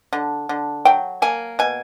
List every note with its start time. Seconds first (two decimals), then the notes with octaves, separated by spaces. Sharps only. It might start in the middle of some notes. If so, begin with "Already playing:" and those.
0.13 D3
0.49 D3
0.85 F#3 G5
1.22 A#3 G#5
1.59 B2 G#5